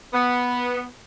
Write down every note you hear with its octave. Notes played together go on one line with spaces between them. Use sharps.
B3